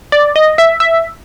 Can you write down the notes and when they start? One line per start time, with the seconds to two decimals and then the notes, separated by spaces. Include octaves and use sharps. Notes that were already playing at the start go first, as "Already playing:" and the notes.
0.12 D5
0.36 D#5
0.58 E5
0.80 E5